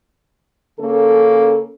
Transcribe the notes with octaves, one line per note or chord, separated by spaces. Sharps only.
C#3 A#3 C#4 A4